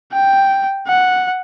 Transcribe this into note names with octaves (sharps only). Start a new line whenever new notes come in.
G5
F#5